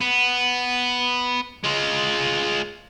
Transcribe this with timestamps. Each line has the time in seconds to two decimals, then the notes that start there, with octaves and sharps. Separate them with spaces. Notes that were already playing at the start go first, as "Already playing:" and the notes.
0.01 B3
1.64 G#3 F4